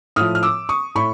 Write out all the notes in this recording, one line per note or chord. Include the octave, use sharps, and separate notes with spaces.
A2 F3 D#6 F6
F6
D6 E6
C#6 D#6
A2 B5 C#6